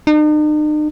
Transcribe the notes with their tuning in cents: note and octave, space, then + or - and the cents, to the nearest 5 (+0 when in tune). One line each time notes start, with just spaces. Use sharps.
D#4 -45